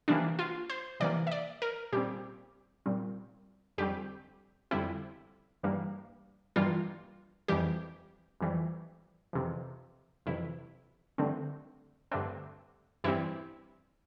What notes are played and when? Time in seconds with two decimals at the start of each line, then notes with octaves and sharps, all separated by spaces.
0.08 C3 E3 A#3 D4
0.39 F4
0.69 C5
1.00 C3 E3 A#3 D5
1.27 E5
1.32 D5
1.62 A#4
1.93 A#2 G3 C4 G4
2.86 A#2 G3 C4
3.78 F2 D3 G3 C4 G4
4.71 F2 D3 G3 C4 E4
5.63 G2 E3 G3 A#3
6.56 G2 E3 G3 A#3 F4
7.48 F2 E3 G3 G4
8.41 F2 E3 G3
9.33 F2 C3 E3
10.26 F2 C3 E3 E4
11.18 G2 D3 A3 C4
12.12 G2 D3 A3 C4 D4
13.04 G2 E3 G3 C4 E4